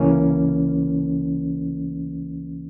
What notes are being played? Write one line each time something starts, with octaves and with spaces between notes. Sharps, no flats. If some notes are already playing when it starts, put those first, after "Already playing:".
Already playing: C#2 C#3 E3 A#3 C#4